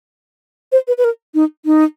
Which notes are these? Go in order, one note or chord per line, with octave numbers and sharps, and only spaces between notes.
C5
B4
B4
A#4
D#4
D#4